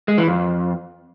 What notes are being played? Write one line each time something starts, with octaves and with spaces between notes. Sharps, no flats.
G#3
E3
F2